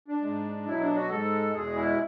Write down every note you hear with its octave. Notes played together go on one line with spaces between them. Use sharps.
D4
G#2 G#3
B2 F#3 E4
D4
F#4
G#2 G#3 A4
E2 B2 G#3 G#4
E4